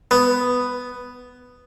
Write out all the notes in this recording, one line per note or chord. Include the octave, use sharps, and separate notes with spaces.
B3